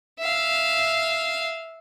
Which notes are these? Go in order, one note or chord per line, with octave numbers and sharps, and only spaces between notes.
E5 F5